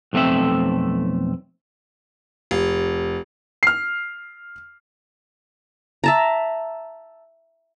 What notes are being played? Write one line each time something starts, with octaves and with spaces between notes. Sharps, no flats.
B1 F2 A3 C4 E5
F1
F6 C7
E5 A5 A#5